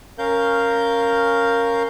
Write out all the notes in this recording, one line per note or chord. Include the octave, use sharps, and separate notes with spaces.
C#4 A#4 F5 G6